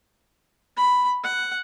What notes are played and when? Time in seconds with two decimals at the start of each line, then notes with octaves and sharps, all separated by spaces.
0.77 B5
1.24 F#5